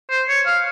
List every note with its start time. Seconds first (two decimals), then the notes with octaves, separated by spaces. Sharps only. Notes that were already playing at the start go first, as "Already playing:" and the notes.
0.10 C5
0.28 C#5
0.46 F5